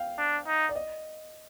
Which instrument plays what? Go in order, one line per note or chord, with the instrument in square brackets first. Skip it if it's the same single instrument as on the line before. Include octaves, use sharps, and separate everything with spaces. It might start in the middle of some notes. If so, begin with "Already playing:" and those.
Already playing: [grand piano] F5 G5
[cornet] D4
D#4
[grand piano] D5
D#5